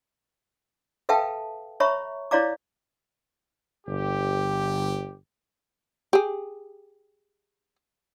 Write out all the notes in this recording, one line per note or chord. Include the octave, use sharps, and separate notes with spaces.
A4 B4 E5 F5 G5 A5
C#5 E5 A#5 B5 C#6
E4 C#5 D5 F5 A#5 D6
G1 G4
G4 G#4